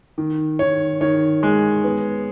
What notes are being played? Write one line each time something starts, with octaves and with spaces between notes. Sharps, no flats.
D#3
D#3 C#5
D#3 C#5
G#3
B3